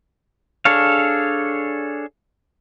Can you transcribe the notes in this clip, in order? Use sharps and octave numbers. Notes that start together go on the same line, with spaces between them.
D4 G#4 A4 C#5 F5